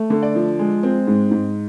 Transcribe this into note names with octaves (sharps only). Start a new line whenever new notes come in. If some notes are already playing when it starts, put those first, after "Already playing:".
Already playing: A3
D3
D5
F3
G#3
C4
G#2
G#2